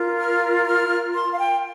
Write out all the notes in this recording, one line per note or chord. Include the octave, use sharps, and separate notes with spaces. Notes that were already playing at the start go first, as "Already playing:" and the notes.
Already playing: F4 A#4
F6
F6
C6
F5
G5